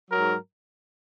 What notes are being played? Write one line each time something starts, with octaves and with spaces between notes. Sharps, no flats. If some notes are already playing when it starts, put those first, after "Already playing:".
G#2 F#3 A#4